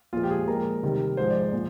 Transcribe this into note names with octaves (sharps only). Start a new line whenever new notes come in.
A#2 F3 G#3 F4
G4
G#4
A#2 F3 G#3 A#4
C3 D#3 G3
G#2 F3 G#3 C5
D5
C5
A#2 F3